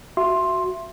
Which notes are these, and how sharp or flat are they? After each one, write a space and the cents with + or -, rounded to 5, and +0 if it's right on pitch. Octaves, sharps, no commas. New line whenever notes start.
F#4 +0 E5 +20 C6 +10